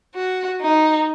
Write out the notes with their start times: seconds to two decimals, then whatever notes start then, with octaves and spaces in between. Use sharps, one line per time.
0.15 F#4
0.62 D#4